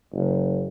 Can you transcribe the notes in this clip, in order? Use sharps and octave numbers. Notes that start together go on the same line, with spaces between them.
F#1